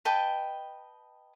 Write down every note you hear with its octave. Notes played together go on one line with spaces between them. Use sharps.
B4 D#5 G5 A5